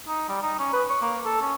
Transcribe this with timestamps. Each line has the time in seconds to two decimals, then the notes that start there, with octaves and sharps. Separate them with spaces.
0.08 D#4
0.29 G3
0.42 D#4
0.59 C#4
0.73 B4
0.90 C#5
1.02 A#3
1.25 A4
1.41 C#4